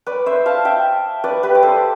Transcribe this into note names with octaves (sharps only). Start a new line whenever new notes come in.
B4 D5
C5 E5
F5 A5
E5 G5
B4 D5
G4 B4
D5
A4 C5